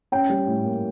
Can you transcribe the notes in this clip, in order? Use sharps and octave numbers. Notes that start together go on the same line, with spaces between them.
C#4 G5
G3
A2
A#3